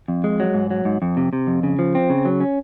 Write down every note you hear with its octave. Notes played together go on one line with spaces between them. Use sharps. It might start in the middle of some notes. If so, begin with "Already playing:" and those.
F2
G#3
F#3
G#2
F#3
G#2
F2
C3
C3
F2
C#3
F3
C4
C#3
F#3
C#4